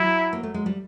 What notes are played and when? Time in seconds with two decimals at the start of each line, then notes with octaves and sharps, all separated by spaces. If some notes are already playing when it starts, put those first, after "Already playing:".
Already playing: F#3 E4
0.33 A#3
0.43 A3
0.54 G#3
0.66 G3